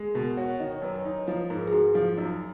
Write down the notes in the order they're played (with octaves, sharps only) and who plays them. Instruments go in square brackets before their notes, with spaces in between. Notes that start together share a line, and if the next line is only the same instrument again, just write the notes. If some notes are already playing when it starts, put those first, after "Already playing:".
Already playing: [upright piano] G#3
[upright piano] B2 [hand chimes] A#4
[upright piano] F#4 [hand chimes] C#5
[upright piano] D#3 [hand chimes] D#5
[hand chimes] C#5
[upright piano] F#2 [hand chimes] B4
[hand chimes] C#5
[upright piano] D#4
[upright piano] F3 [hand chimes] B4
[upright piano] G#2 [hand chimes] A#4
[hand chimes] G#4
[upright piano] G#2 [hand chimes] F#4
[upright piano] F3 [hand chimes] F4
[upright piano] F#2 [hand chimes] D#4